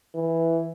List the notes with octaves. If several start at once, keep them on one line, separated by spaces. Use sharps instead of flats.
E3